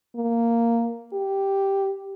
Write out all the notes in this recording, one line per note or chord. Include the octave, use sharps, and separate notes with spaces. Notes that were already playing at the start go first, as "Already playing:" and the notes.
A#3
G4